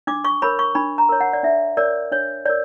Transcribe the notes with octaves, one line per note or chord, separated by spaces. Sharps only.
D4 D6
C#6
A#4 C#5 B5
C#6
D4 B5
A#5
A#4 C#5
F#5
D5
D4 E5
A#4 C#5 D5
D4 C#5
A#4 C#5 D5